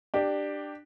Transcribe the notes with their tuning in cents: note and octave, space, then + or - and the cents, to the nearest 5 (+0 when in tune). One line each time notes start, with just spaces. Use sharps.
D4 +15 G4 +0